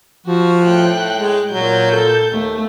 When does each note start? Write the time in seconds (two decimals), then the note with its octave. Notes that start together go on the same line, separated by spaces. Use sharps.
0.26 F3 F#4
0.66 A2 G5 F#6
1.16 G#3
1.51 A#2 F#3 G6
1.93 A4
2.32 D#2 A3